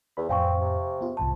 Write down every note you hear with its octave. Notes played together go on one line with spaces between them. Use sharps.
E2 B5
F2 A2 C4 F5 G#5 C#6
C3
B3 F4 G#4
C2 G#2 C5 A5